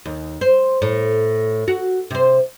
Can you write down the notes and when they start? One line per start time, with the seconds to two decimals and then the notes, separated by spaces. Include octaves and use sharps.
0.05 D#2
0.41 C5
0.82 A2
1.68 F#4
2.10 C3 C5